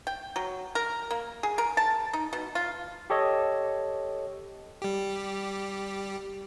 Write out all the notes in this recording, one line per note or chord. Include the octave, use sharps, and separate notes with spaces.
G5
F#3
A#4
A#3
G#4
A#4
A5
D#4
B2
F4
G4 A4 C#5 D#5
G3 G4